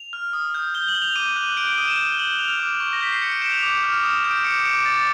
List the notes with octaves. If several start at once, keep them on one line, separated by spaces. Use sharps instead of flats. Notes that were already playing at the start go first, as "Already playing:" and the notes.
Already playing: F7
F6
D#6
G6
G6 G7
F#7
G6
F7
D6 D#7
F#6
G6 D7
D7
D#6 D#7
E7
G6 G7
G7
G6 F#7
F6 F7
D6
C#6
A#6
G6 B6
C7
G6 C#7
D7
G6 E7
F7
D6 F7
F6
D#6 E7
G6
D7
D6 C#7
D6 D7
D6 A6